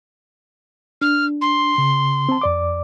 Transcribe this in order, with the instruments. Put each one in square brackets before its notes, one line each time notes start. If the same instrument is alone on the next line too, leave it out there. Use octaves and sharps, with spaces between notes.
[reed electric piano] D4 [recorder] F6
[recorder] C6
[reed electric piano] C#3
C4 A5
F2 D5 D6